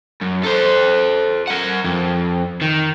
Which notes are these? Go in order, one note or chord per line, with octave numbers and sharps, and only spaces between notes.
F#2
A4 C5
A#4 F#5
F2
D#3